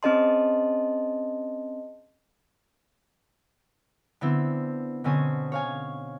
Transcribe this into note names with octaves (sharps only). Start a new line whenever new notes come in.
C4 C#4 G#4 D#5 A5 C6
D3 B3 C4 E4
B2 D3 C4 C#4 G#5 D#6
C#5 F5 G#5